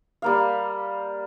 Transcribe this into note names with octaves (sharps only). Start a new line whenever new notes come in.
G3 A#3 F5